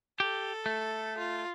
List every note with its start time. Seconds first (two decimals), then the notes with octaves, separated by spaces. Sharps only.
0.20 G4 A4
0.66 A3
1.18 F4